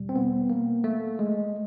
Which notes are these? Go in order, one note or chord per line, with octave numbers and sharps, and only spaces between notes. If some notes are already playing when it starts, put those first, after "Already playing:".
Already playing: E2 B2 G3
C4
B3
A#3
A3
G#3